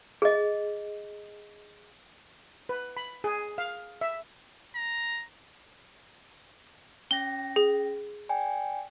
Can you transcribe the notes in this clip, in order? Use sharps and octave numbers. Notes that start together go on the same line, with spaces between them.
G#4 D#5
B4
B5
G#4
F5
E5
A#5
C#4 G5 A#6 G7
G#4
D5 G5 G#5